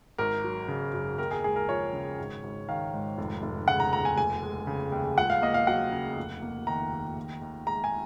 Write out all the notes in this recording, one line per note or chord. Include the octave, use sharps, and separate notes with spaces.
G#1 A#4
F#3
C#3
F#2
D#2 A#4
G#4
G#3 G#4
A#4
F3 C#5
C#3
G#1
G#1
D#3 F5
G#2
F1
F1
C#3 F#5
A#5
D#2 A#5
G#5
F1 G#5
G#3
C#3
D#2
C#2 F#5
F5
A#3 D#5
F5
F#3 F#5
C#3
F1
A#3
D#3 A#5
D#2
D#2
D#2
G#3 A#5
G#5